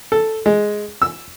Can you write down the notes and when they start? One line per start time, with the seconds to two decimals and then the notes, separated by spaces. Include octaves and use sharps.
0.12 A4
0.46 G#3
1.02 E6